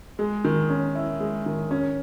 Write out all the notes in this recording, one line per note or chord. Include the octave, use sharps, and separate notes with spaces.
G#3
D#3
C#4
E4
G#3
D#3
C#4